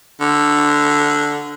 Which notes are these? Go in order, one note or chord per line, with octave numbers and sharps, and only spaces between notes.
D3